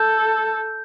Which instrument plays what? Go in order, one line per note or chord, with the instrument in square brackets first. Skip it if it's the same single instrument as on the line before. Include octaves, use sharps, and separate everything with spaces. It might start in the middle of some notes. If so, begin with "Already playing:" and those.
Already playing: [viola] A4 [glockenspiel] G6